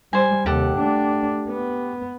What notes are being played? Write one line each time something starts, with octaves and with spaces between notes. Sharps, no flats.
G3 C5 G#5
D#2 C3 G4 A4 F#5
A3 D4
B3